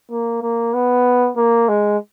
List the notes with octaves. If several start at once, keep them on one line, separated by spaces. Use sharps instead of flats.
A#3
A#3
B3
A#3
G#3